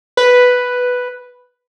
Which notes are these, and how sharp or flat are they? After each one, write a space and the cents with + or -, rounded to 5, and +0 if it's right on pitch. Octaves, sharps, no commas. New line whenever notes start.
B4 +0